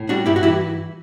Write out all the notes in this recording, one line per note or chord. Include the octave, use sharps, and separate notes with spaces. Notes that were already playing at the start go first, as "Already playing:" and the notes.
Already playing: A2
G3 D4 F#4
G2 E4 G4
F#4
E3 E4 G4